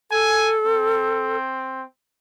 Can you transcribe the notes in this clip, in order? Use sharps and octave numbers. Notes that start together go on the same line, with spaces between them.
A4 G#5
C4